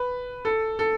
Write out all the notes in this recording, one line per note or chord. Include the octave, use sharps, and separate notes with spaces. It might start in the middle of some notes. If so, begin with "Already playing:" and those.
Already playing: B4
A4
A4